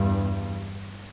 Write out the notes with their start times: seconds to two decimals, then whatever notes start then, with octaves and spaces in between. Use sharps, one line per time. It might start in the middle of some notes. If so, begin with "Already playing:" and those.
Already playing: E2 G2